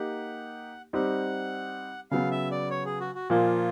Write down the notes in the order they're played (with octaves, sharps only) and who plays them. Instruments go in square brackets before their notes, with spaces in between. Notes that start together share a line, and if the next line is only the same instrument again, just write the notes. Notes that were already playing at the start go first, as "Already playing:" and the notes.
Already playing: [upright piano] A#3 D#4 G4 [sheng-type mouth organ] F#5
[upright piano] G3 C4 D#4 G4 [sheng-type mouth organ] F#5
[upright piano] C#3 F#3 B3 [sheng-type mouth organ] F5
[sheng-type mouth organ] E5
D5
C#5
G#4
F#4
F#4
[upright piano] A#2 F3 A#3 [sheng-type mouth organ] F4